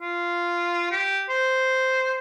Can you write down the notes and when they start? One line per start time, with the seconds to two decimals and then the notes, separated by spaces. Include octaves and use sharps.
0.01 F4
0.91 G4
1.30 C5